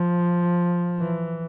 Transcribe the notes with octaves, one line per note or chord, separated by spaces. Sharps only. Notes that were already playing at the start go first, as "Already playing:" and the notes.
Already playing: F3
E3